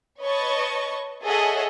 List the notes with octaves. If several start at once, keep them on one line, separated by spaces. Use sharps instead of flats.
B4 C#5 D#5 A5 C#6
G#4 A4 C#5 D#5 E5 F#5